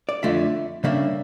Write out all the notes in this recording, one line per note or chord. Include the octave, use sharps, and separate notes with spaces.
D5
F2 D3 F3 A3 E5
C#3 G3 A#3 D4 E5